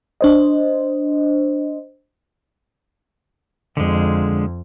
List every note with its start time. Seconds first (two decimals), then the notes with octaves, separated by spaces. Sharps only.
0.21 D4 C5 D#5
3.77 F2 D3 G#3